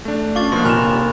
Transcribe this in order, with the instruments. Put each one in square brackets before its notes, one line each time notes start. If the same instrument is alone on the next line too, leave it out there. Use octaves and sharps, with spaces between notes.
[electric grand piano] A3 D4
[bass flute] C#4 [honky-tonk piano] F4 F5 F#7 [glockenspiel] C#6 D6 A6
[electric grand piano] B2 F3 [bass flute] A#3 [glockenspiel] C6 F#6
[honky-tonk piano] F1 A#1 D#2 [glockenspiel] G#5 B5 F7 [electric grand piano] F6 E7